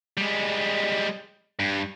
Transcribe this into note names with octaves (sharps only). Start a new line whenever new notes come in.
G3 G#3
G2